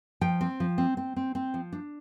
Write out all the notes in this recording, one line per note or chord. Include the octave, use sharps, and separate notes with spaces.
F3 G5
C4
F3
C4
C4
C4
C4
F3
D4